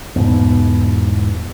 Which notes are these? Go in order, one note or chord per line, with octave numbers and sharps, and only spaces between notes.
E2 G#2 B2